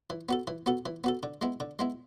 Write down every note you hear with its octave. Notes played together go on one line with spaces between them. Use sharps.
E3
B3 F#4 A4
E3
B3 F#4 A4
E3
B3 F#4 A4
D3
G#3 B3 E4
D3
G#3 B3 E4